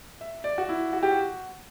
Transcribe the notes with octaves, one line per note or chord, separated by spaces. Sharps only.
E5
D5
F#4
E4
F#4
G4
F#4